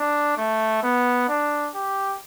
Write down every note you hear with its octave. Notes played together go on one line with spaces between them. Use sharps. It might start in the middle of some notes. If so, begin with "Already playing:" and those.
Already playing: D4
A3
B3
D4
G4